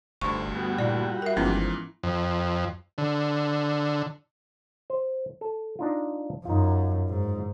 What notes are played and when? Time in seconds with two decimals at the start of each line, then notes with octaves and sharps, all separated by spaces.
0.21 F1 D2 G2 C5 C#6
0.55 G3 B3 F#4
0.79 A#2 E4 D5
1.22 A#4 E5
1.37 G1 G#2 E3 F3 B3 C#4 E4
2.03 F2
2.98 D3
4.90 C5
5.41 A4
5.79 D4 D#4 F4
6.45 F#2 D#4 F4
7.09 G#2